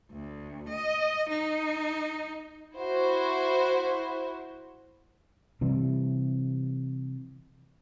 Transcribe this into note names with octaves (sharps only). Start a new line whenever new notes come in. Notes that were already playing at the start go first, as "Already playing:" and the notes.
D2
D#5
D#4
E4 F#4 C5
C3 E3 G3